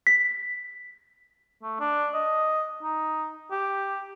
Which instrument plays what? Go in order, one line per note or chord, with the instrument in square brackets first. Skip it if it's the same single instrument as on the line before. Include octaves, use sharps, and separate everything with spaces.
[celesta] B6
[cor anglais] A3
D4
D#5
D#4
G4